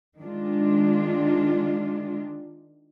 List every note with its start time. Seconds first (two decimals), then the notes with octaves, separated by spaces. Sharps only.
0.19 D#3 G#3 D4 F4